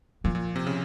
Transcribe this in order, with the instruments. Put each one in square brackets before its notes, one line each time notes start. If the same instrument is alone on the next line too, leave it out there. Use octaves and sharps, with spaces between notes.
[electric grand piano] A#2 [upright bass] F3
[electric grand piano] A#2
C3
C#3